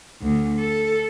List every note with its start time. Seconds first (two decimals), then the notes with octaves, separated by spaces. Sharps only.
0.22 D2
0.60 A4